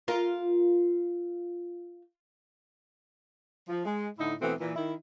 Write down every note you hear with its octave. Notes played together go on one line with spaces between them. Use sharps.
F4 A#4
F3
G#3
A2 D3 D#4 E4
B2 E3 A3 B3 C4 F#4
A#2 E3
D#3 E4